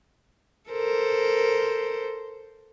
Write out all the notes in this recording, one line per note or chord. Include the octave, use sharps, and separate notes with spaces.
A4 A#4 C5